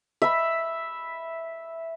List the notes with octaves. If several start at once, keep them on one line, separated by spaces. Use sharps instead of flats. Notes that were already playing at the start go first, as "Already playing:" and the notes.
E5 B5